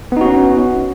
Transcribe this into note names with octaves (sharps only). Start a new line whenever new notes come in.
B3 C#4 D#4 F#4